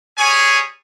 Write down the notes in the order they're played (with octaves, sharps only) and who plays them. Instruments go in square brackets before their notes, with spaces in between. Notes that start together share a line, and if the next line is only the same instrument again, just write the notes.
[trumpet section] G3 G#4 C#5 G#5